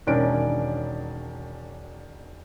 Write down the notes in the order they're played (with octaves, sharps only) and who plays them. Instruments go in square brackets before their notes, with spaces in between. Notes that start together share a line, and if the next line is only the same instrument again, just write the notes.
[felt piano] E1 D#3 C#4 D4 D7